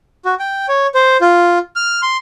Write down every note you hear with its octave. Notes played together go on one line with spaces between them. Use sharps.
F#4
G5
C#5
C5
F4
F6
C6